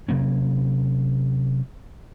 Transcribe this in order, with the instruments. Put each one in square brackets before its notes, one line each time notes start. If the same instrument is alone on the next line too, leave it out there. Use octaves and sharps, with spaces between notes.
[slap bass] C3 F#3 A#3 C#4